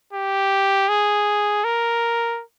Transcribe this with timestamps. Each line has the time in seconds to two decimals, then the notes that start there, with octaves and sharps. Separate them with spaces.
0.13 G4
0.89 G#4
1.64 A#4